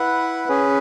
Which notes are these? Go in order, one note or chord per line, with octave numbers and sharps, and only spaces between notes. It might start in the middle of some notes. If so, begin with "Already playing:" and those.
Already playing: E4 B4 F#5
C#4 G#4 B4